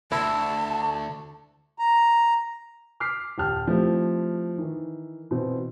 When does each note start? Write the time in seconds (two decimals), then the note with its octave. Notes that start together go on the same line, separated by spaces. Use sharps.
0.12 D2 E4 A5
1.79 A#5
3.00 D6 F6 B6 C7
3.38 D#1 G5 A5 F6
3.67 F3 A3 C4 E4 G4
4.58 D#3 E3
5.31 B2 E3 C4